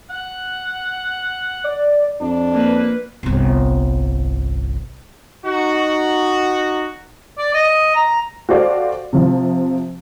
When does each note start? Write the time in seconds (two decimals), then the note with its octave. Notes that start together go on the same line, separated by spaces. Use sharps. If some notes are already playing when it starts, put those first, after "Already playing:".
0.10 F#5
1.64 D5
2.21 F2 D4
2.52 A#3 B4
3.23 G1 C2
5.45 D#4 F#4
7.38 D5
7.54 D#5
7.95 A#5
8.49 F#4 G4 A4 C5 D5 F5
9.13 C3 F3